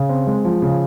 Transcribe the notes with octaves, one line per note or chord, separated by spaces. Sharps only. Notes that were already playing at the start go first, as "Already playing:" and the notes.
Already playing: C#3
C4
G#3
F3
C#3